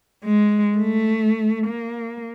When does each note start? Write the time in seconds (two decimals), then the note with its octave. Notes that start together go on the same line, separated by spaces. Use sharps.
0.24 G#3
0.77 A3
1.67 A#3